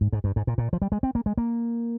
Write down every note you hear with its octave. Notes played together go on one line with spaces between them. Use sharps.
G#2
G#2
G2
G#2
A#2
A#2
F3
G3
G#3
C4
A#3
G#3
A#3